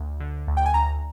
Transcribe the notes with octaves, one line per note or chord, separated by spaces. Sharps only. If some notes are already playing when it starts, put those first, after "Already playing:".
Already playing: D2
D3
D2
G5
G#5
D2 A#5